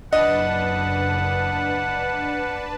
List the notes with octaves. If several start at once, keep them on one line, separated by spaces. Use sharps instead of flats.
F#1 D4 B4 D#5 F#5 A5